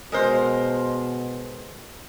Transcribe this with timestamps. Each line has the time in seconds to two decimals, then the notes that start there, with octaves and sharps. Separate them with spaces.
0.12 B2 G#3 A#4 C5